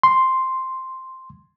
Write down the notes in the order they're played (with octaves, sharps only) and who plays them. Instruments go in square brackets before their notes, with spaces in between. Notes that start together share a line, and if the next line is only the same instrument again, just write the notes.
[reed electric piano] C6